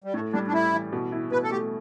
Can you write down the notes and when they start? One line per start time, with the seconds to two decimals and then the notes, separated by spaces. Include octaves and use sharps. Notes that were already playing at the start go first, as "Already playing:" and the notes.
0.04 G3
0.14 A2 A3
0.33 G3 D4
0.47 D4
0.53 A2 E4
0.73 E3
0.92 B2
1.12 E4
1.32 B2 B4
1.43 A4
1.51 A3 G4